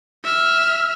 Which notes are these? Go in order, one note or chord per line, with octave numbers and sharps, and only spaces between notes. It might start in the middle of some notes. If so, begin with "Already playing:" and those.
E5 F6